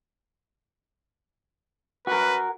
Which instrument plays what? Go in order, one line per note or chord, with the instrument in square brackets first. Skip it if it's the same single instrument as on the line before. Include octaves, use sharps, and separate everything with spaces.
[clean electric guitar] F#4 A#4 [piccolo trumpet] B4